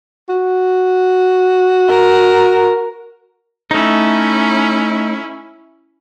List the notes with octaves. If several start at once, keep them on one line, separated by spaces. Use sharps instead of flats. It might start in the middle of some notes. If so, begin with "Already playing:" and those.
F#4
A#4
A3 C#4 D#4 E4